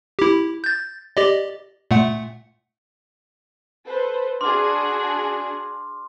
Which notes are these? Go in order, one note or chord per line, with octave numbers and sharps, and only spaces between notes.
E4 G4
G6 A6
G4 D5 D#5
A#2 A3 F#5
A4 B4 C5
D4 F#4 G#4 C6 D6 F6